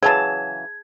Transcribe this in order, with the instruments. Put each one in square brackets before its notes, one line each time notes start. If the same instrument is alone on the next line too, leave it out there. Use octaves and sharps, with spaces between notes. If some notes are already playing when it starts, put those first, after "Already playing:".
[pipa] C#3 E3 F#3 [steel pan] G#4 A5 [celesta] G#6